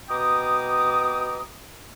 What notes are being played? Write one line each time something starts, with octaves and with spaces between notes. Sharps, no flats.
B2 G5 A#5 D6 D#6